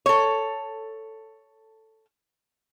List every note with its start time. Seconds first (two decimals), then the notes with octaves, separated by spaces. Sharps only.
0.06 A4 C#5